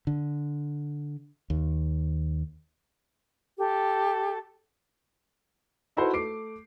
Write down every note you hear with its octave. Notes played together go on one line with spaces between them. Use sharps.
D3
D#2
G4 A4
D#4 E4 F#4 A4 B4 C5
A3 D6 C7 D7